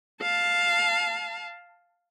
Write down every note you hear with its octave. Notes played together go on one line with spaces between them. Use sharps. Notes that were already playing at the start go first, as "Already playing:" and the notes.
F5 A5